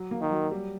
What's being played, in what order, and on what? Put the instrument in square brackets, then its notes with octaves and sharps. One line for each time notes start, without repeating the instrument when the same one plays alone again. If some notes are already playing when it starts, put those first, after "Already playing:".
Already playing: [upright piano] F#3
A#3
[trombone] D#3
[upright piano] F#3
G3